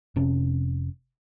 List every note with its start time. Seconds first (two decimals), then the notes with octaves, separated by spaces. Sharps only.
0.16 F1 C3 C#4